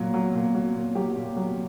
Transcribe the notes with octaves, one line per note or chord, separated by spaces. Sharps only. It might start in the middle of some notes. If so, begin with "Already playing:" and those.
Already playing: A#2 F#3
F#3
A#2
F#3
A#2
F#3 G4
A#2
F#3